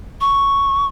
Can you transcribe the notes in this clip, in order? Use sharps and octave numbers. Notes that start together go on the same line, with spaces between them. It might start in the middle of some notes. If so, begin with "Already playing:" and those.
C#6